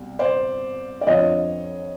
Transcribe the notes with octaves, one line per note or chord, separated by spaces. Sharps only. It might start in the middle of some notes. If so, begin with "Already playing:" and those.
Already playing: C2 B2
C5 D5
D5
F2 D3 F3 C#5 D#5